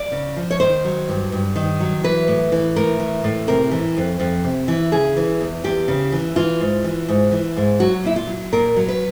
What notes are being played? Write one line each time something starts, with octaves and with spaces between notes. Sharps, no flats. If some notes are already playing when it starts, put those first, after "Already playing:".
Already playing: D5
C#3
F3
C#5
D#3 C5
F#3
G2
G2
D#3
F#3
E3 B4
A2
E3
A2 A#4
E3
A2
C3 A#4
E3
F2
F2
C3
E3
C#3 G#4
E3
E2
E2 G4
C#3
E3
E3 F4
G#2
E3
G#2
E3
G#2
F#3 F#4
A#2 E4
F4
F#3
A#2 A#4
F#3
B4